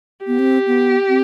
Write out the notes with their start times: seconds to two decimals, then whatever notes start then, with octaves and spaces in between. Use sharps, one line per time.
0.26 B3 G4
0.39 C4
0.67 B3
1.09 C4